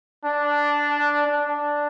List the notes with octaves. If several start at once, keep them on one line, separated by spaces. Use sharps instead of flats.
D4
D4